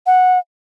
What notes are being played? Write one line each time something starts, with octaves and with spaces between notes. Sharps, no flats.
F#5